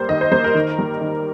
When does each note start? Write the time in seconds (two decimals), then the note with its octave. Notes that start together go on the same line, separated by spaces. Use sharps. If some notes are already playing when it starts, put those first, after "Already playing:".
Already playing: G3 A#3 C5
0.09 D#3 D#5
0.21 C5
0.31 G3 A#3 C5
0.44 A#4
0.55 D#3
0.79 G3 A#3
1.01 D#3